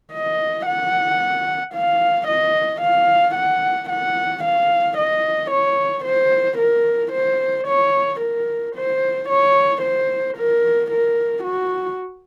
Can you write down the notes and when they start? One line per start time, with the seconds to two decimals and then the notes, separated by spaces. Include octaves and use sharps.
0.12 D#5
0.66 F#5
1.74 F5
2.27 D#5
2.81 F5
3.35 F#5
3.89 F#5
4.44 F5
4.98 D#5
5.51 C#5
6.04 C5
6.58 A#4
7.12 C5
7.67 C#5
8.20 A#4
8.75 C5
9.29 C#5
9.82 C5
10.37 A#4
10.91 A#4
11.44 F#4